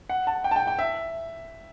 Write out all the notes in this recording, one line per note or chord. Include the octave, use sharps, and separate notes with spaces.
F#5
A5
G5
A5
G5
G5
E5